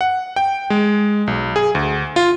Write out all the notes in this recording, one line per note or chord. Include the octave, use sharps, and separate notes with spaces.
F#5
G5
G#3
B1
G#4
D2
F4